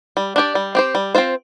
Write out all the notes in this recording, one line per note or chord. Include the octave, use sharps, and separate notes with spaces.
G3
D4 G4 D5
G3
C4 G4 C5
G3
C4 F4 C5